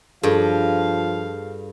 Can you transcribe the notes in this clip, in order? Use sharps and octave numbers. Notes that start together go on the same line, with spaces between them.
G2 F3 G#4 A4 F5